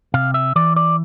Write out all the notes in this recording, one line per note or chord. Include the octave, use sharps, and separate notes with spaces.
C3 F5
E5
E3 D5
D5